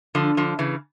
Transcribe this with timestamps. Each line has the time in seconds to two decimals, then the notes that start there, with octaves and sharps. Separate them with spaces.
0.15 D3 F3
0.37 D3 F3
0.59 C#3 E3